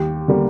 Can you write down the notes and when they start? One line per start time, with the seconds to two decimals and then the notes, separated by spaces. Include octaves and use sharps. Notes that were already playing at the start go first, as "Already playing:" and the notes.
Already playing: D#2 G4
0.28 D3 G3 A#3